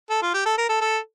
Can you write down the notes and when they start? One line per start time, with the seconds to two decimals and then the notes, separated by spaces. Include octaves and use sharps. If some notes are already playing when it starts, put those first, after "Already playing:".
0.10 A4
0.22 F4
0.34 G4
0.46 A4
0.58 A#4
0.69 A4
0.81 A4